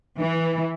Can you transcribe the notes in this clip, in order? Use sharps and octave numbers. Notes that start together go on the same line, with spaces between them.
E3